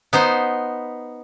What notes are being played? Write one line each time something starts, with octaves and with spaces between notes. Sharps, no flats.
B3 D#4 C5